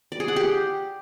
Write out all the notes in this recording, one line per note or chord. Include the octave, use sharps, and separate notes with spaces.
D5
G#4
F#5
G4